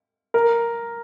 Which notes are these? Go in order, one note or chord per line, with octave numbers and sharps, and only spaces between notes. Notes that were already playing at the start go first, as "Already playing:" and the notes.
A#4